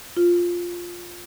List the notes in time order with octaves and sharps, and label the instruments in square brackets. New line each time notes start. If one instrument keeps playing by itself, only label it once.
[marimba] F4